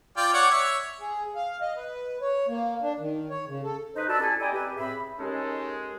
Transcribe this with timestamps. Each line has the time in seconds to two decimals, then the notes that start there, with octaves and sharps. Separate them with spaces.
0.17 F4 D5 G5
0.33 C#5 D5 F#5
0.51 C#5 E5
1.01 G#4
1.35 F5
1.61 D#5
1.76 B4
2.22 C#5
2.48 A#3
2.82 D4
3.00 D#3
3.30 C#5
3.48 C#3
3.63 A4
3.96 D#4 B4 C5 D#5
4.09 F#4 A4 D5 A5 B5 E6
4.20 C#4 E4 G4 A4 G#5 A5
4.40 D5 D#5 G5 G#5 A#5 B5
4.52 C4 G4 B4
4.77 A2 C4 G#4 E5 B5
5.19 G#3 C#4 D#4 G4 A4 A#4